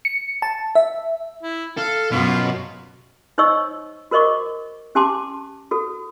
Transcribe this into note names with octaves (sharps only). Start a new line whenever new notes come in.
C#7
A5
E5
E4
A4 F5
F#2 B2 F4
D#4 C5 C#5 D#5 C#6 E6
F#4 A#4 C5 D#5 C#6 D6
C#4 G4 G#5 A5 C6 D6
F#4 A4